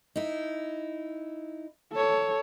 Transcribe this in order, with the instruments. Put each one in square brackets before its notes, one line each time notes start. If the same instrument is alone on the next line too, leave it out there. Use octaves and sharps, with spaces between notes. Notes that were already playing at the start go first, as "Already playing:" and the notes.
[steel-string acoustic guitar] D#4 E4
[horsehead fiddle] A4 C#5